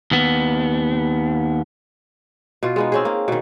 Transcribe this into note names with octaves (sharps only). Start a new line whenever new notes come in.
D#2 B3
B2 F4
G#3 B3 D#4
C4 C#4 G#4
A#3
B2 D#3